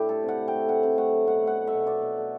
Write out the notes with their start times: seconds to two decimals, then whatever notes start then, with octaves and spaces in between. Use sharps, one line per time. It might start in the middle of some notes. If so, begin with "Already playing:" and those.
Already playing: A2 D4 E4 G4
0.09 A3 A4
0.24 C3 F#5
0.38 A3
0.48 G5
0.53 A3
0.68 C3 F#5
0.83 C3 G5
0.98 A3 F#5
1.13 F#3
1.27 B2 F#5
1.43 A3 F#5
1.57 A3
1.67 E5
1.72 B2
1.87 B2 D5
2.02 B2
2.17 A3